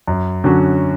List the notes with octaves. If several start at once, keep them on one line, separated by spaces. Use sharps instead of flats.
F#2
D3 F#3 C#4 F#4